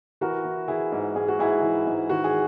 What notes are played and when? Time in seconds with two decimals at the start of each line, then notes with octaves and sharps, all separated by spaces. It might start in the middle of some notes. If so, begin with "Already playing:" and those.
0.21 E3 F#4 A#4
0.44 E3
0.68 E3 E4 G#4
0.92 G#2
1.15 G#2 G#4
1.28 F#4
1.39 G#2 E4 G#4
1.62 E3
1.87 G#2
2.09 D#3 F#4
2.24 G#4